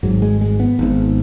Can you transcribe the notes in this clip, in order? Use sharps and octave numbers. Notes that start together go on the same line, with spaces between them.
G#1 G#2 F#3
G#3
G#3
B3
G#1 G#2